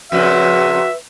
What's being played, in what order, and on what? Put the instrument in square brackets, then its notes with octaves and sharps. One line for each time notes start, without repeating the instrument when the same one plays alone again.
[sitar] F2 A#2 C#3 [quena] F#4 [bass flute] B4 [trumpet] E5